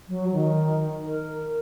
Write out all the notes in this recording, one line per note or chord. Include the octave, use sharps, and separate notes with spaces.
F#3
D#3
A#4